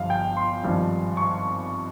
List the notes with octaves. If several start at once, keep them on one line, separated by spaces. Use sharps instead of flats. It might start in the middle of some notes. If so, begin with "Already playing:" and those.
Already playing: G1 G2 F3 F5
G5
C6
G#1 G2 F3
C#6